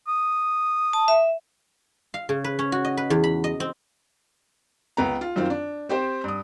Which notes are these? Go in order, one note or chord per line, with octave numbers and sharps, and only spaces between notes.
D#6
A5
E5
F5
C#3
B4
C#4
F#4
D#5
B4
E2
B5
D#5
C4
C#2 B3 A#5
F4
F#2 D#3 C4 F4
D4
C4 G4 C5
G2 D#6